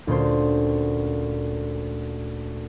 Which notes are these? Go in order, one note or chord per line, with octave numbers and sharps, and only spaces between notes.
D2 A#2 C#4 C5